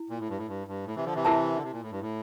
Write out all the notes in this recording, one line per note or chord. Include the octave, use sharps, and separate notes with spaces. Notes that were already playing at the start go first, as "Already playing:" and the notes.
Already playing: E4
A#2
A2
G2
A2
G2
G2
A2
C3 E3
D3 F3
C3 E3
E4 A#4 E5 A5
D3
C3
A#2
A2
G2
A2